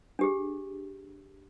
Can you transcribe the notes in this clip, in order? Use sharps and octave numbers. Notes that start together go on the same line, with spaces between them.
D4 G4 G#4